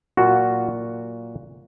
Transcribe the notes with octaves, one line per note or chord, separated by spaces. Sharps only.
A#2 F#3 A#3 F4 F#4